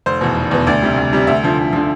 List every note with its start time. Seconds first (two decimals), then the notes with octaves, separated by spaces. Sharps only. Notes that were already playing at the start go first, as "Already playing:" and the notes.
0.06 F1 C5
0.21 E2 B2
0.37 F1
0.51 E2 B2
0.66 D2 D5
0.82 C3 G3
0.97 D2
1.13 C3 G3
1.27 D2 E5
1.43 D3 F3
1.58 D2
1.73 D3 F3